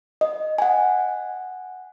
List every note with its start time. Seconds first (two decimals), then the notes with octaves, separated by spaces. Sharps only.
0.21 D#5
0.58 F#5 G#5